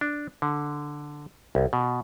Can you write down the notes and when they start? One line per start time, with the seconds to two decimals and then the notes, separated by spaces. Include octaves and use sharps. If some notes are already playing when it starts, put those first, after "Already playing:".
0.01 D4
0.42 D3
1.55 C2
1.73 B2